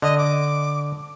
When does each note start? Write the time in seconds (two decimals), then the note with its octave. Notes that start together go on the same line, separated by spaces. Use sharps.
0.02 D3 D#5
0.18 D6